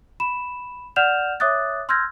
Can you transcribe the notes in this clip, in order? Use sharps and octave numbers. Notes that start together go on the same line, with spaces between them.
B5 E7
D5 F#5 F6 G6 E7 F7
C#5 E5 D6 D#6 F#6 A6
C6 E6 F6 G6 G#6 A#6